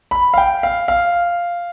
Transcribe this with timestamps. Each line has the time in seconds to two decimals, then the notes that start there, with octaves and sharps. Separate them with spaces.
0.11 B5
0.34 F5
0.38 G5
0.63 F5
0.88 F5